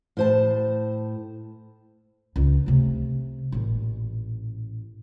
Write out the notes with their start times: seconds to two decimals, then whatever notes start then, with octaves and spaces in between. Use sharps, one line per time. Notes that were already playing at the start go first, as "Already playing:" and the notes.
0.17 A2 C5 A5
2.36 C#2
2.66 C3 A3
3.52 A1 A#2